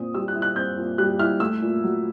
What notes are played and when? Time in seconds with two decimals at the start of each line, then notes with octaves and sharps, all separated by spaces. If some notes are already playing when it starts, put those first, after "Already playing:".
Already playing: A#2 C4 D#6
0.14 G3 E6
0.28 F#6
0.35 E4
0.42 F#6
0.56 C4 G6
0.77 A#2
0.98 G3 F#6
1.19 E4 F6
1.40 A3 E6
1.61 A#2
1.83 F#3